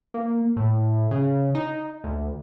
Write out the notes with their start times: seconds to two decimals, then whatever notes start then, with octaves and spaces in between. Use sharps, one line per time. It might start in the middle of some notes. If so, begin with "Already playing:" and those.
0.14 A#3
0.57 A2
1.11 C#3
1.55 D#4
2.04 D2